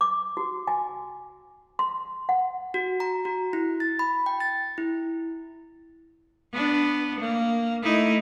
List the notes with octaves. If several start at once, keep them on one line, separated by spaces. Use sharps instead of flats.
D6
F#4
G#5
C6
F#5
F#4
A#5
F#4
E4
A6
B5
G5
A6
E4
B3 D4
A#3
A3 D#4 E4